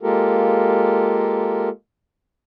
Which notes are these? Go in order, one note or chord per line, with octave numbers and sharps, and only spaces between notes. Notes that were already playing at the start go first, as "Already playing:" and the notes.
G#3 A#3 F4 G4 A4 A#4